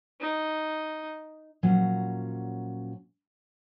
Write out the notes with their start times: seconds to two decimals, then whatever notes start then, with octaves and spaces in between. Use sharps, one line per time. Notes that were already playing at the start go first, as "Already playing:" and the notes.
0.20 D#4
1.63 A#2 F3 F#3 C#4 F#5